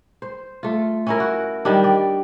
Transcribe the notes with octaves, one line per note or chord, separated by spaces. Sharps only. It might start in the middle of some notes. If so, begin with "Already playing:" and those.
C5
A3 F4
C#4 E4 A#4
F#4
D#3 G3 D4
D5